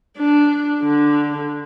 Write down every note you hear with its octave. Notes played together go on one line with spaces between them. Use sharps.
D4
D3